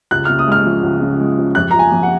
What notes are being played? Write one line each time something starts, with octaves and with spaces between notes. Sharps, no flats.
C#2 F#6
C#3 F6
D#6
G#3 F6
F3
C#2
C#3
G#3
F3
F2 F#6
F3 A#5
G#5
F2
F#5